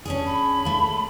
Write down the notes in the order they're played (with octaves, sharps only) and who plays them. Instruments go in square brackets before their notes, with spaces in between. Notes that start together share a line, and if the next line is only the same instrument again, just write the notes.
[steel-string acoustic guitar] C#4 D4 G#4
[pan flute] B5
[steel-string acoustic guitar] A3 A#3